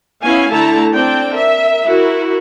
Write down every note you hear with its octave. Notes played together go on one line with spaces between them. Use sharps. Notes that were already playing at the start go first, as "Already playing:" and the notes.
B3 C#4 E4 F5 G#5
D3 A3 E4 A4 A5 A#5
C4 D4 G5
A#4 E5
E4 F#4 A#4